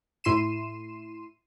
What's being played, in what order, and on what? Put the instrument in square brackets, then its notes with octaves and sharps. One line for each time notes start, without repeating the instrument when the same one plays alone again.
[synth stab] A2 E4 C6 C7 D#7 E7